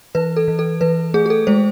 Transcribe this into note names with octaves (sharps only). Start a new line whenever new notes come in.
E3 B4
A4
E3
A4
E3 B4
A3 G#4
G#4
A4
G#3 C5